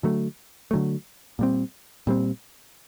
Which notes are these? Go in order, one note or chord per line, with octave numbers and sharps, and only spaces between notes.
D3 F#3 A3
D3 F#3 A3
A#2 G3 C4
A#2 G3 C4